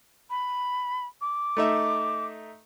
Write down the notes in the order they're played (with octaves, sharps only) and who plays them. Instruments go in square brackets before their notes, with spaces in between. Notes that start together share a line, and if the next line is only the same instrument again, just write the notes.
[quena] B5
D6
[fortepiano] A3 D#4 E5